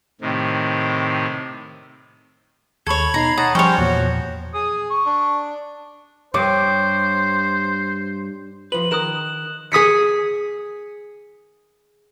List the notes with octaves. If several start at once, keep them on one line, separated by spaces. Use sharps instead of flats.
A2 C3 D#3
D#2 A4 C#5 B5 C#6 G#6
B2 D#4 A#5 C7
C#5 F#5 A5 A#5 D#6
F3 G3 C#4 C5 C#5 G5 C#6
E2 A#2 F#4
G#4 D#6
C#6
D4
G2 C5 C#5 D6
F3 B4 F#7
D#3 A#4 D#6 F#6 E7
G#4 D#6 B6 C#7